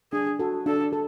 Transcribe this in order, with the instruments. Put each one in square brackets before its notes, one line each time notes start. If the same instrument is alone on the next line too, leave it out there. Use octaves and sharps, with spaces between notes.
[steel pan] D4 [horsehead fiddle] G#4
[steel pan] F#4 A4
[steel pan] D4 [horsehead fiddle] A4
[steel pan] A4